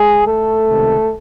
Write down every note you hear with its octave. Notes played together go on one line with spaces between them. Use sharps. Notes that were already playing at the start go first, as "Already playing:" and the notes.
Already playing: G#3 G#4
A3 A4
C#2 C3 D#3